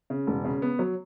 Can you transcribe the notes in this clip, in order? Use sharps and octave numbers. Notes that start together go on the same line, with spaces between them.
C#3
E1
C#3
B3
F#3